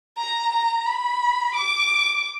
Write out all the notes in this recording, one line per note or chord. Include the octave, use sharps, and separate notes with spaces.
A#5
A#5
B5
D6